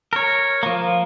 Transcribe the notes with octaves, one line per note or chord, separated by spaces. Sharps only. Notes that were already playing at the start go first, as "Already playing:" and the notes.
A#4 C#5
F3 A#3